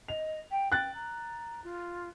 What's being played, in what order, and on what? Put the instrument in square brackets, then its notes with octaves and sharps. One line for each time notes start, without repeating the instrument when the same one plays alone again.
[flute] D#5 [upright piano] F7
[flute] G5
[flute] G5 [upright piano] F#6 A6
[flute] A#5
F4